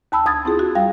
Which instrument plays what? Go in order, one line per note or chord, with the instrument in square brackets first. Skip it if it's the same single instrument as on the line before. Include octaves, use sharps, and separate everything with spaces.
[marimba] D#2 A5 B5 E6
D2 D#6 G#6 A6
C4 E4 F4 G#4
F#4
G3 F5 G5